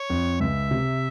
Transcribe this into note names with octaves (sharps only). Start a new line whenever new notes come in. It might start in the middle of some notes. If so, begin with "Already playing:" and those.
Already playing: C#5
F2
C#2 E5
C3